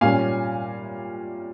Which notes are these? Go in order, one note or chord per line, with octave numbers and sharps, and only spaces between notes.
A#2 G3 C#4 F5 G#5